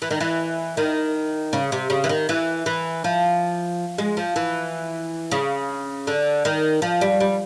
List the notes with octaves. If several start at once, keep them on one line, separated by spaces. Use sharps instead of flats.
E3
D#3
E3
D#3
C#3
C3
C#3
E3
D#3
E3
E3
F3
G#3
F3
E3
C#3
D3
D#3
F3
G3
G3